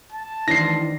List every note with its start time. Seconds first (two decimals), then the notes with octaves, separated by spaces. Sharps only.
0.12 A5
0.48 D#3 E3 D4 C5 A#6 C7